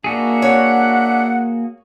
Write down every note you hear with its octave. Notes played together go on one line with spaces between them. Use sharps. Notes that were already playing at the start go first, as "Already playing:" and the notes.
A#3 D4 F#4 G#4 E5
C#5 F#5